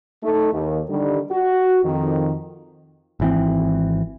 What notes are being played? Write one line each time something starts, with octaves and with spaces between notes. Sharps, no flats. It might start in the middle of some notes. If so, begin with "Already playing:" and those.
A3 D#4
D#2
D3 D#3 G3
F#4
F2 D#3
G#1 E3 C4